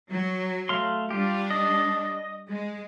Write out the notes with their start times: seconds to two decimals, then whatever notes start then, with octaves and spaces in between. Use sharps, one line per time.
0.10 F#3
0.69 A3 F5 C6
1.10 G3 D4 F4 G4
1.51 D#5
2.49 G#3